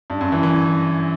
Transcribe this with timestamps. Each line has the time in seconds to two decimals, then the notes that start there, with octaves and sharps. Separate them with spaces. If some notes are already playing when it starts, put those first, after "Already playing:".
0.10 G2
0.21 F#2
0.32 E3
0.43 E3